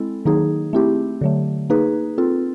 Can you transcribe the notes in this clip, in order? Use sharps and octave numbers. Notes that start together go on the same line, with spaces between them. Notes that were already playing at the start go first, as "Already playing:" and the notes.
Already playing: G#3 C4 E4 A4
D#3 F#3 A#3 D#4 G#4
A3 C4 E4 G4
D3 F#3 A3
A#3 D#4 G#4 B4
C4 F4 A4